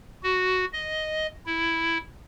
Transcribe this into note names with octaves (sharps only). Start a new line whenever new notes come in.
F#4
D#5
E4